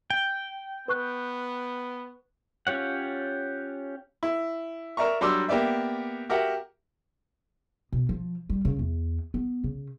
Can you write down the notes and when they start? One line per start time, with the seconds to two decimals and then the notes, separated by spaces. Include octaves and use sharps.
0.10 G5
0.88 B3 B4 C#6 F#6
2.67 C#4 F4 G4 C#5 F#5
4.23 E4
4.97 A#4 D5 E5 A#5 C#6
5.21 F#3 G3 D4 C6 D6 E6
5.48 A#3 B3 G4 D5 E5
6.30 F#4 G4 A#4 E5 F#5
7.92 B2
8.09 F3
8.50 G3
8.65 C#3
8.79 E2
9.34 B3
9.64 C#3